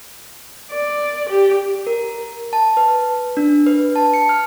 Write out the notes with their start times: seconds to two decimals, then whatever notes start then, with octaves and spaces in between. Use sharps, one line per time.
0.71 D5
1.29 G4
1.87 A#4
2.53 A5
2.77 B4
3.37 D4
3.67 B4
3.96 A5
4.14 C#7
4.29 F6